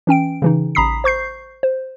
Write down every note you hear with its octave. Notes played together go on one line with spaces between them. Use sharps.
E3 C#4 G5 D7
C#3 E3 D#4
A1 A#5 B5 D#6 B6 C7
C5 C#6 G6 C7
C5